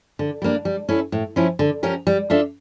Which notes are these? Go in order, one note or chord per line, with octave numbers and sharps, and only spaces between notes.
D3
G3 A#3 D4
G3
C#4 E4 A4
A2
F3 C#4 E4
D3
F3 C#4 G4 A#4
G3
D4 F4 A4 E5